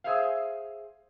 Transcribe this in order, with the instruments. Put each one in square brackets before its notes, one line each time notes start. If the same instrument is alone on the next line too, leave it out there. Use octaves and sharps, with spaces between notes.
[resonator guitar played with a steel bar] G#4 C5 E5 F5